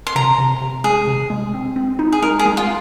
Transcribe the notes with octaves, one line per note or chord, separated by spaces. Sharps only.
C6
C3 A#5
C3
C3
G#3 G#4
C3
G#3
C4
C4
D#4
G#4
G#3 A#4
G#4
G#3
F4